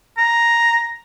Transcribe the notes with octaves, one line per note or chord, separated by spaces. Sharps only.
A#5